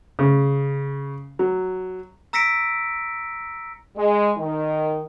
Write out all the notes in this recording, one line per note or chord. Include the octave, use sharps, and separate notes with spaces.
C#3
F#3
A#5 E6 A#6 B6 C#7 D7
G#3
D#3